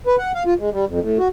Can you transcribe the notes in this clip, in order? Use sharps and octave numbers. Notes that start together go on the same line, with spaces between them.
B4
F#5
F5
F4
G#3
G3
F2
A2
F#4